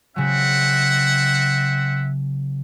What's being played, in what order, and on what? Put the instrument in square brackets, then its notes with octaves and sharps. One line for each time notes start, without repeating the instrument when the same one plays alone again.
[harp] C#3 F#3 [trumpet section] C4 E5 F#5